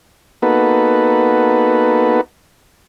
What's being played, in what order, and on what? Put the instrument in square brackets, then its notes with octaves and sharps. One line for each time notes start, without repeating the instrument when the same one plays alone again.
[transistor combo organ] A#3 B3 D#4 F#4 A4 B4